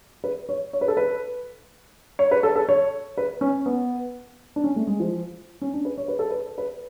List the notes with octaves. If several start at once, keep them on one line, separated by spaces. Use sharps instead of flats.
B4
C#5
C#5
B4
A4
B4
C#5
B4
A4
A4
C#5
B4
C#4
B3
D4
C#4
A3
G#3
F3
C#4
D4
B4
C#5
B4
A4
B4
B4